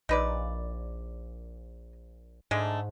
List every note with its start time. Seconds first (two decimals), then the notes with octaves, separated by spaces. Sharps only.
0.09 A#1 D#4 B4 D5
2.51 G#2 D3 G#3 A3